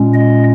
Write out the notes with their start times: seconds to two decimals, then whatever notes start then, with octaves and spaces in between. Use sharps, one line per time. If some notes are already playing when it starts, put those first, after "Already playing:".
Already playing: A#2 G#3 C#4
0.14 D#5